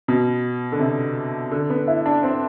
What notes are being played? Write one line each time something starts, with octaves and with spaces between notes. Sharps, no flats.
B2
D3
C3
D3
B3
E4
D4
C4